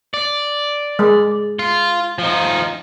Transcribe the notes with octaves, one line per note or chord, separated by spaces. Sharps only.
D5
G#3
F4
F3 D#4